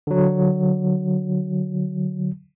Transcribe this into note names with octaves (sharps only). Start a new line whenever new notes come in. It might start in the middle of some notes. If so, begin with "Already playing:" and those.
D3 F#3